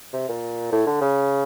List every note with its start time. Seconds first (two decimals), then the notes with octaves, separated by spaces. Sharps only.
0.13 C3
0.29 A#2
0.72 A2
0.87 D3
1.01 C#3